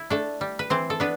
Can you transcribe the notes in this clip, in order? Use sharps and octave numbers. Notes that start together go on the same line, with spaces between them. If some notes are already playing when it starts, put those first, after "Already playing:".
Already playing: E4
A3 D4 A4
G3
B4
E3 C4 C5
A4
B3 D4 B4